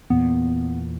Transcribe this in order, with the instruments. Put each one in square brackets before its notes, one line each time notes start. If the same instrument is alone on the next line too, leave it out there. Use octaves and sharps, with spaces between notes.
[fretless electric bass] E2 A#2 [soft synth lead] B3